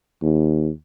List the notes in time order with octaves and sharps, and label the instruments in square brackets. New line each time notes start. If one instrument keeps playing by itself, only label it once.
[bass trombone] D#2